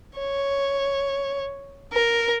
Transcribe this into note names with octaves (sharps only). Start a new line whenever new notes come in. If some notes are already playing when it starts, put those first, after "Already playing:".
C#5
A#4